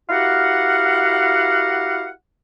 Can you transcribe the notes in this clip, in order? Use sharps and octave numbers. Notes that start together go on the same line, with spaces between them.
E4 F#4 G4 A#4 F5 F#5